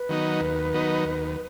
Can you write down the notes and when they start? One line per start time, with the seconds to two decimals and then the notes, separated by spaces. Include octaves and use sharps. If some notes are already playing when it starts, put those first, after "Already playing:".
Already playing: B4
0.09 D#3 F#3 B3 D#4
0.41 D#2
0.73 D#3 F#3 B3 D#4
1.05 D#2